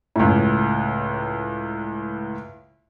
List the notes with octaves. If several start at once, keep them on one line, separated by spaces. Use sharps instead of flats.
C#2 A2